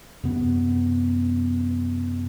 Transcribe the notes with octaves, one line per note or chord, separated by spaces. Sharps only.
F#2 C3 B3